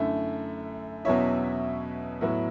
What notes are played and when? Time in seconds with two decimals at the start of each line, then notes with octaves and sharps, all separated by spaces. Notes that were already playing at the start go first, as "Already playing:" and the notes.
Already playing: F#2 D3 A3 E4
1.05 E2 B2 F#3 C#4 E4 C#5 E5
2.21 A2 F#3 B3 E4